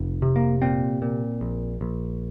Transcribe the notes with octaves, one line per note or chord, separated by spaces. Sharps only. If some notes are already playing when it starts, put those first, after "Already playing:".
Already playing: F1
C3
A#3
A#2 C4
A#2
A#1
A#1